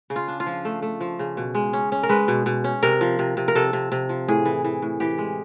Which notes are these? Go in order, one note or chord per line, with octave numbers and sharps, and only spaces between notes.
C#3
F4
D4
F4
F3
A3
A3
F3
C#3
B2
G#3
C#4
C#4
A#4
G#3 B4
B2
B2
C#4
C3 A#4
F3
C3
C3
A#4
C3 A4
C3
C3
F3
A2 G#4
E3
E3
A2
E3 G4
G#3